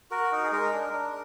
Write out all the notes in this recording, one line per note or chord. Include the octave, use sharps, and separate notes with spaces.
F#4 A#4
D#4
G#4
G#3 A#4
D4
D4